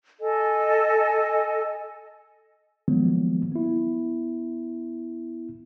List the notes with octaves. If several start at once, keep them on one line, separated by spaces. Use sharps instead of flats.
A4 D#5 G#5
D#3 F3 F#3 G#3 A#3 B3
B3 E4